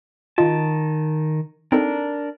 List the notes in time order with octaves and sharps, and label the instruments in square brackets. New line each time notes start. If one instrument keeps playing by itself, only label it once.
[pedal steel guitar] D#3 A5 [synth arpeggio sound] F4 D#5
[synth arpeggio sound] C4 D#4 A4 [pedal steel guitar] D4 A#4